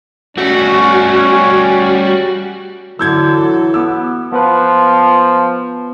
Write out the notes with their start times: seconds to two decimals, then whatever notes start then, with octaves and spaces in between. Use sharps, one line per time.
0.38 G3 A3 C#4 F#4
2.99 D3 E3 F#3 A4 E6 G6 G#6
3.74 B3 D6 E6
4.33 F3 B3 B4